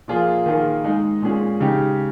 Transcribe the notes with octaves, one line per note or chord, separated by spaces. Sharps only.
A#2 F3 A#3 F4 G#4
D#3 A#3 F4 G#4
G#3 D#4 G#4
A#2 G#3 C#4 G#4
C#3 G#3 D#4 G4